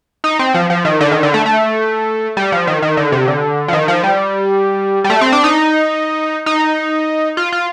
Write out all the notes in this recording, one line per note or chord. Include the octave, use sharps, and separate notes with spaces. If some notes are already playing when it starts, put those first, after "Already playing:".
D#4
C4
F3
F3
D#3
D3
D#3
D3
A3
A3
G3
F3
D#3
D#3
D3
C3
D3
F3
D#3
F3
G3
G3
A3
C4
D4
D#4
D#4
F4
F4